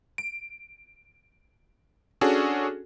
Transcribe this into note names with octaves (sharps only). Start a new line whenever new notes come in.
D7
C#4 D4 F#4 G#4 A4